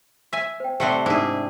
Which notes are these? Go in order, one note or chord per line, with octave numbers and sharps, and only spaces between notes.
E5 G#5
C5 G5
C3 G3 A3 C4 F#5
G#2 D4 E4 G#4